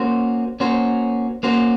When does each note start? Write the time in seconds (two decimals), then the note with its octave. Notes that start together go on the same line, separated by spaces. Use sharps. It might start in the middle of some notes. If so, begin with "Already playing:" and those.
Already playing: A#3 C#4 F#4 C5
0.60 A#3 C#4 F#4 C5
1.43 A#3 C#4 F#4 C5